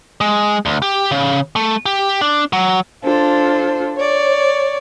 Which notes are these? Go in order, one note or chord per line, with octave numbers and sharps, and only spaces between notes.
G#3
D2
G4
C#3
A3
G4
D4
F#3
D4 F4 A4 C5
C#5 D5